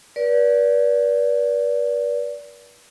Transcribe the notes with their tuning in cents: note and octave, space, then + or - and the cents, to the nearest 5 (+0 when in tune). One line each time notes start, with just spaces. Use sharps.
B4 -40 D5 -20